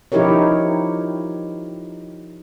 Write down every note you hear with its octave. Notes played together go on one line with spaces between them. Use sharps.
F3 D#4 E4 G4 A#4 C#5